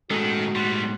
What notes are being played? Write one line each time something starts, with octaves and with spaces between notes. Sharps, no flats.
A2 D#3 G#3 C#4 F#4 A4
G3 B3 C6 F#6